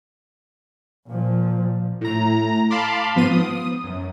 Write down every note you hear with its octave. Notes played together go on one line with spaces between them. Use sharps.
A#2 F3
A2 A#5
F5 A5 B5 C6 D6
G#2 F3 B3 C6 D#7
D#6
F#2